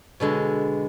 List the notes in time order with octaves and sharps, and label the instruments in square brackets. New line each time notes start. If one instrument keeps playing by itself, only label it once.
[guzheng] B2 D3 G#3